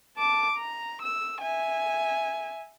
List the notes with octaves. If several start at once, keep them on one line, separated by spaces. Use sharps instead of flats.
A5 D6
A#5
E6
E5 G#5